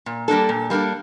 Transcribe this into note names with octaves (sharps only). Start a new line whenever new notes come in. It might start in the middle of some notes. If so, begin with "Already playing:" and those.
A#2
G3 A#3 D4 A4
A#2
G3 A#3 D4 A4